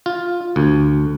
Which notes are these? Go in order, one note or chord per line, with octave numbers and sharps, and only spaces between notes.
F4
D2